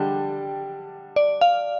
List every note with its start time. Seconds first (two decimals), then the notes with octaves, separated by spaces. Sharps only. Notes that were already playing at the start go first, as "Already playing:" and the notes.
Already playing: D3 G3 D4 G5
1.16 D5
1.41 F5